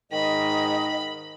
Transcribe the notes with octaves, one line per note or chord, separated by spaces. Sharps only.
G#2 D#3 D#5 B5